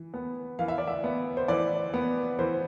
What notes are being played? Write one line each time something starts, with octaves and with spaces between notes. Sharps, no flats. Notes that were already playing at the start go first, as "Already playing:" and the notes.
Already playing: E3
B3
E3 F5
E5
D5
E5
B3
C5
E3 D5
B3
E3 C5